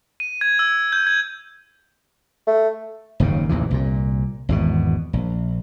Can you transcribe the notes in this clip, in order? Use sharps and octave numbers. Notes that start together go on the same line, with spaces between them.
D#7
G#6
E6
G6
G#6
A3
F#1 D#2 G#2 C#3
A1 D#2 C3 E3
C2 A#2
G#1 E2 B2
A#1